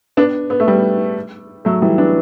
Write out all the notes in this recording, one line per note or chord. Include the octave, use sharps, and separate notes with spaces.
B3 D4
B3
A3
G3 B3
F#3 A3
E3 G3
B3 D4